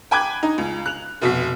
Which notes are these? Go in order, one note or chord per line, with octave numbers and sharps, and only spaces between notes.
G5 G#5 B5 D6 F#6 G#6
D#4
C#2
F#6 F7
F1 B2 F#4 B6